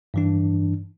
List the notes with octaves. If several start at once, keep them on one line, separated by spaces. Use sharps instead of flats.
G2 E3 D4